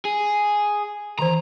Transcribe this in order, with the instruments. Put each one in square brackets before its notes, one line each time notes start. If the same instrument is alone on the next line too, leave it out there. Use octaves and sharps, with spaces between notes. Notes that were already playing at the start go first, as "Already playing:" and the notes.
[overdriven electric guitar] G#4
[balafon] D#3 E3 C5 [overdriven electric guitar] A#5